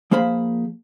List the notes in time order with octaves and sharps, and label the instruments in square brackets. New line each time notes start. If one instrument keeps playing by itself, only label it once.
[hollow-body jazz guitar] F3 A#3 G#4 C5 B5